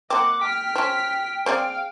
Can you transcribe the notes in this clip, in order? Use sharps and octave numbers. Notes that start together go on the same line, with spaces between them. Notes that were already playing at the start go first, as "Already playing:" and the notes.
A#3 C4 D#5 F#5 D6
G5 F6 B6
F3 C#4
C4 G#4 D5 F5